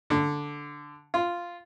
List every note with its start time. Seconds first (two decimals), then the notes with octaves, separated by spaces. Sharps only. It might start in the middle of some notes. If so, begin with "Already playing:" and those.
0.10 D3
1.14 F4